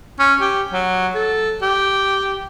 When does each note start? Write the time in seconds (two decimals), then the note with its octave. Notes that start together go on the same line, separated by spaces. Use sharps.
0.19 C#4
0.41 G4
0.72 F#3
1.15 A4
1.62 G4